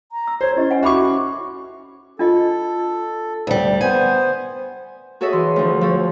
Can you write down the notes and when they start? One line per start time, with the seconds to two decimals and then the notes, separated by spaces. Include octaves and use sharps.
0.12 A#5
0.27 E6
0.41 C5 C#5
0.56 C#4 E4 G4 D#5
0.70 F#5 G#5 C6
0.83 F#4 E5 B5 C#6 D6
2.19 D4 F4 A4 D#5
3.47 D2 G3
3.81 B3 C5 G#5
5.21 F#4 G#4 A4 C#5 D#5 E5
5.33 E3 C6
5.56 D2 F3
5.81 F3 A4 C#5